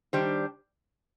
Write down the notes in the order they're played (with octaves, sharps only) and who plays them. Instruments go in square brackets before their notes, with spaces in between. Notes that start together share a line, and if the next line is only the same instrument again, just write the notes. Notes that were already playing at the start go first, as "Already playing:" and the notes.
[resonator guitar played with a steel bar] D#3 G3 D4 G4 C5